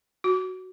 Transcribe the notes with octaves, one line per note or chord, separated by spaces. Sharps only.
F#4